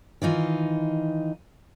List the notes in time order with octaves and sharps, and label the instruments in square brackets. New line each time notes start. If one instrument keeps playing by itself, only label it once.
[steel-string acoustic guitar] D#3 E3 D#4 F4